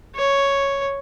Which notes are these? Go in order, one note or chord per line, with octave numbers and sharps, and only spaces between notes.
C#5